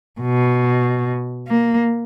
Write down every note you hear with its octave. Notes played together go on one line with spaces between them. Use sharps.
B2
A#3